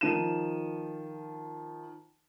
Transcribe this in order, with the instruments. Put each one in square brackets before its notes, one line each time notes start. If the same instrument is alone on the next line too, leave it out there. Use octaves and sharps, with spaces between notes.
[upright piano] D#3 F3 D#7 E7